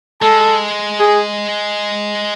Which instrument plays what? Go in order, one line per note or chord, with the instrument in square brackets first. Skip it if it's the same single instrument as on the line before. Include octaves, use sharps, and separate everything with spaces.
[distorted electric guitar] G#3 [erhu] A4
[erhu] G#4